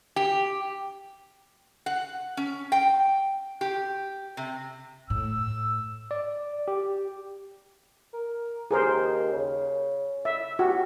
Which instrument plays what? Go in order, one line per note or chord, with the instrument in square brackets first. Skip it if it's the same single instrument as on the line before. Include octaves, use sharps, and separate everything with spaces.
[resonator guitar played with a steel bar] G4
F#5
C#4
G5
G4
C3
[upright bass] A2 [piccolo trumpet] E6
[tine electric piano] D5
G4
[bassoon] A#4
[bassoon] D#2 [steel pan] G#4 A#4 C5
[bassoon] C#3
[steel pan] E5
[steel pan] F#4 [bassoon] G4